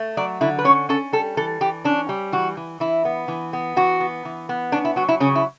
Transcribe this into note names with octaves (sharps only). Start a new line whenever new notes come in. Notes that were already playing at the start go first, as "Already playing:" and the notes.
Already playing: A3
F#3 D5
D3 E4
B4
C#4 C#5
C#4 A4
G3 A4
E3 A4
E3 G4
C#4 D4
G3
E3 F#4
E3
E3 E4
B3
E3
B3
E3 F#4
B3
E3
B3
C#4 D4
E4
F#3 F#4
E4
C#3 C#4
E4